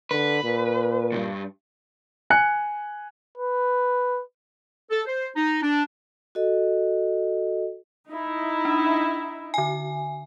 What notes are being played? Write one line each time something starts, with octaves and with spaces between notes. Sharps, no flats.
D3 B4
A#2
C#2 G2
G#5 F#6 C#7
B4
A4
C5
D#4
D4
F#4 A4 D#5
D#4 E4
D4
D3 G#5